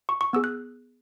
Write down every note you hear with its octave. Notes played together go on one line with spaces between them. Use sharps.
C#6
C#6
B3 G#4 E6
F#6